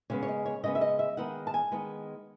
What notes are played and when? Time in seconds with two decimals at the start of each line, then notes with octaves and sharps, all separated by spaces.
0.10 C#3 G#3 B3 C#5
0.22 C#5
0.28 D#5
0.46 C#5
0.63 C#3 G#3 B3 D#5
0.75 E5
0.81 D#5
0.99 E5
1.17 D#3 G#3 B3 F#5
1.47 A5
1.54 G#5
1.72 D#3 G#3 B3